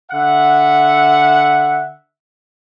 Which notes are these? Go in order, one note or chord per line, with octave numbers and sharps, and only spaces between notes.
D3 E5 F#5